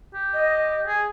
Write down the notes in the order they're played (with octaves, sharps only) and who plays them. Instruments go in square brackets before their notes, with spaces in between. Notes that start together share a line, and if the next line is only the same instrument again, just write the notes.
[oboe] G4
[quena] D#5
[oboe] G#4